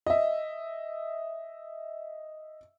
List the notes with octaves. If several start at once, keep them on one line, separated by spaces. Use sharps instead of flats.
D#5 E5